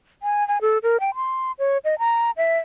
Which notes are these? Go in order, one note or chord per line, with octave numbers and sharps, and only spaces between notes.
G#5
G#5
A4
A#4
G5
C6
C#5
D#5
A#5
E5